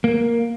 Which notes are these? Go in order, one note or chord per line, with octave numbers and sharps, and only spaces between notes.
A#3